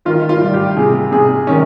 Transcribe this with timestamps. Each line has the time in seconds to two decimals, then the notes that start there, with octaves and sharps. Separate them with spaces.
0.05 D#3 F4
0.29 F4
0.41 G3
0.53 G4
0.77 C3 G#4
1.12 C3 G#4
1.47 D#3 C#4